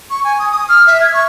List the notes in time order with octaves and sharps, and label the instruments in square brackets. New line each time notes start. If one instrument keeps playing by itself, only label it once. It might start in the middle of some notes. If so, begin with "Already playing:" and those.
[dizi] C#6
G#5
D#6
D#6
F6
E5
G#6
C#6